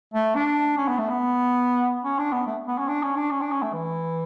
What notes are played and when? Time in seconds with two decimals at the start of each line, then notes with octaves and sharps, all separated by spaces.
0.14 A3
0.35 D4
0.77 C#4
0.88 B3
0.98 A3
1.09 B3
2.04 C#4
2.19 D4
2.32 B3
2.47 A3
2.67 B3
2.78 C#4
2.88 D4
3.03 C#4
3.16 D4
3.31 C#4
3.41 D4
3.52 C#4
3.62 A3
3.73 E3